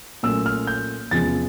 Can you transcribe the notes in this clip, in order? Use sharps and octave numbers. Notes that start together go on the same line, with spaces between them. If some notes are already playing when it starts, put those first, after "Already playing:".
A#2 F#3 A3 C#4 E6
F6
G6
E2 C3 F3 G#3 C#4 A6